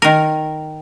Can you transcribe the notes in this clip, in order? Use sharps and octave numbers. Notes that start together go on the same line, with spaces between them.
D#3 A#4